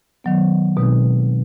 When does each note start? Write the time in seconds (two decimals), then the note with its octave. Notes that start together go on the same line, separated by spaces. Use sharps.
0.24 D#3 F#3 B3
0.77 B2 G#3 C4 D#4